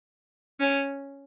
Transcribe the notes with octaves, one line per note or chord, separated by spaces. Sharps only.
C#4